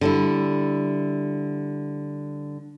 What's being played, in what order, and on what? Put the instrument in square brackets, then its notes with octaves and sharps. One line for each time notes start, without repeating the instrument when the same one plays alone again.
[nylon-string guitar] D3 G3 E4